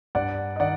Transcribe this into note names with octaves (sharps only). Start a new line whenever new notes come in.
G2 D5 F#5
D#5
D#3 D5 F#5